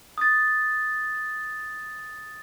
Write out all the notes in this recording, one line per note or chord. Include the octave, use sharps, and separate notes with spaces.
D#6 A6